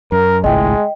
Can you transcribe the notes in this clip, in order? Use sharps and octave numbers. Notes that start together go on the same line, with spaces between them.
F#2 A#4
G#1 C#2 A2 G#3 D#5 G5